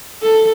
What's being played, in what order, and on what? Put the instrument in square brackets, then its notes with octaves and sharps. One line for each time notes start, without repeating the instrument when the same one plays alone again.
[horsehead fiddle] A4